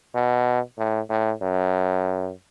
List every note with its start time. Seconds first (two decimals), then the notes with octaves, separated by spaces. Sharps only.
0.15 B2
0.78 A2
1.10 A2
1.42 F#2